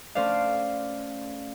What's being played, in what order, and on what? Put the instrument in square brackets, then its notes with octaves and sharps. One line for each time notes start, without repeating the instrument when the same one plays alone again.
[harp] A3 C#4 C5 D5 F5